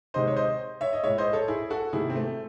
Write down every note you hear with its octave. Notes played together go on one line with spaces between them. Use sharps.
C3 D#3 G#3 C5 D#5
C#5
C5 D#5
C#5 E5
D#5
A2 G#3 C#5 E5
C5 D#5
A4 C#5
E4 G#4
F#4 A4
C3 D#3 A3 E4 G#4
C4
A3